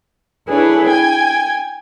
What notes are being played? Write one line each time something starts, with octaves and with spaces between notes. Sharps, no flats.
D4 E4 G#4 A4 B4 C#5
G5 G#5 G#6